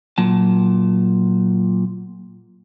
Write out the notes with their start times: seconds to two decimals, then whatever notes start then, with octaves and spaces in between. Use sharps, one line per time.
0.18 A#2 F#3 A5